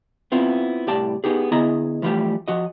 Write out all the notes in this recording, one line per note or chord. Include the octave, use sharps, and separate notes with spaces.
B3 C4 E4 F4
C2 A2 G4 D5 A5
B3 D#4 G4 G#4
D3 B3 E4 G#4 D#5 A#5
A2 E3 F3 G3 A3 G4
F3 F#4 D#5